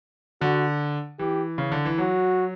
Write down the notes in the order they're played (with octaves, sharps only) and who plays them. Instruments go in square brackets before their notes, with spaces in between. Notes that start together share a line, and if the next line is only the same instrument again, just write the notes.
[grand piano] D3 [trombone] F#4
[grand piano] E3 [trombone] G4
[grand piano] C#3
D3
E3
[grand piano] F#3 [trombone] F#4